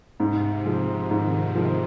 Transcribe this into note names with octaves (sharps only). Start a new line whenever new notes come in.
G#2 C3
F3 G#3
G#2 D#3
F3 G#3